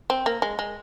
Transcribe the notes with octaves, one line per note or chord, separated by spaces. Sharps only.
C4
A#3
G#3
G#3